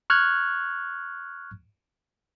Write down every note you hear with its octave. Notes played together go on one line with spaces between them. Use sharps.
C#6 F6 F#6 G#6